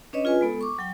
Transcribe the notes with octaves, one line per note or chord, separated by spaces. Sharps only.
C#4 D4 B4 C#5 D#5
F4 G#4 B4 G#5
G#3 B3 A4
C#6 D6
F#3 G5